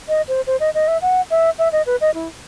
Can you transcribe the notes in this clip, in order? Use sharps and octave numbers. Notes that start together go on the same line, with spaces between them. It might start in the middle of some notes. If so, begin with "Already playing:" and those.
D#5
C5
C5
D#5
D#5
E5
F#5
E5
E5
D#5
B4
D#5
E4